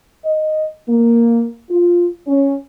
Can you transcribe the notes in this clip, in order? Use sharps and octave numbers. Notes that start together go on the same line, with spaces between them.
D#5
A#3
F4
C#4